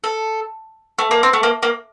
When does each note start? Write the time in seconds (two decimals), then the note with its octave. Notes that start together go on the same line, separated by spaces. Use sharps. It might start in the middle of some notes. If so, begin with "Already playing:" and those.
0.04 A4
0.99 A3
1.11 A#3
1.23 C4
1.33 A3
1.43 A#3
1.63 A#3